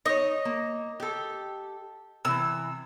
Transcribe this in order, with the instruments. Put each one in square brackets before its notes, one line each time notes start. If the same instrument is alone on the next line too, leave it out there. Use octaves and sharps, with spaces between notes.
[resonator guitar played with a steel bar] D#4 C#5 [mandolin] D#5
[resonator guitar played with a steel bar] A#3
G4 A4
[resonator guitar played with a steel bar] C3 E3 [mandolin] E6